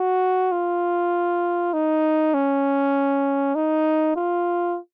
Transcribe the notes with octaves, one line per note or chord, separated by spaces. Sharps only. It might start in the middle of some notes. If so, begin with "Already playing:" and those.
Already playing: F#4
F4
D#4
C#4
D#4
F4